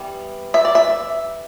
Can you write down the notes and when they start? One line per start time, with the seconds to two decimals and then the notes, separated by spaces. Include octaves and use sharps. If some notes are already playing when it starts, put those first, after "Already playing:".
Already playing: E3 G3 B3
0.54 E5
0.65 D5
0.75 E5